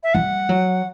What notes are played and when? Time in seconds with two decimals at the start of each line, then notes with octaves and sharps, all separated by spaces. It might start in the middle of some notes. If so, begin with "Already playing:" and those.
0.03 E5
0.14 G3 F#5
0.49 F#3